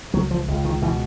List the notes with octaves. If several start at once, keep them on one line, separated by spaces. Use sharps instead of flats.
C#2 F#3
F3
C#2
D#3
B2 E3